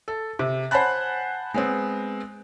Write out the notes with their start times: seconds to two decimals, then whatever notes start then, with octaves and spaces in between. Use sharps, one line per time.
0.08 A4
0.39 C3
0.71 C5 F#5 G#5 A5 B5 F#6
1.54 G#3 B3 C4